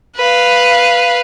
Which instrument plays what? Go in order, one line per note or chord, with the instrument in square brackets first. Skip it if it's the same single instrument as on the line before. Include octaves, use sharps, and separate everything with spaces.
[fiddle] B4 F5